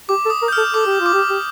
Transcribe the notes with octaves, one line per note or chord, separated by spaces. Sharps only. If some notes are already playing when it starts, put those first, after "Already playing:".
G4 D6
A4
D#6
A#4
G6
F6
A4
A4 D6
G4
F4
D6
G4
G4